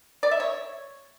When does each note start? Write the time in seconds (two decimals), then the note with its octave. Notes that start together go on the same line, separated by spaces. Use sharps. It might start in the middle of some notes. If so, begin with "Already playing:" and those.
0.23 D5
0.31 E5
0.40 C#5